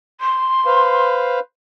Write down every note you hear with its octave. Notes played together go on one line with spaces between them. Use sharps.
C6
B4 C5 F5